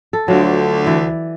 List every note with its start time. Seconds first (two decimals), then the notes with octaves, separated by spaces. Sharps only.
0.13 A4
0.28 D2 F#3 F4
0.84 E3 D5